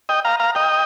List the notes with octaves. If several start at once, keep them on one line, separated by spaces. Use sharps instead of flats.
D#5 G5
F5 A#5
F5 A#5
D#5 G5